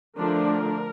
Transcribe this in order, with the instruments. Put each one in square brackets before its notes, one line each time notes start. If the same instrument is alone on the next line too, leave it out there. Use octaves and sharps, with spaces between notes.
[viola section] D3 F3 A3 D4 A#4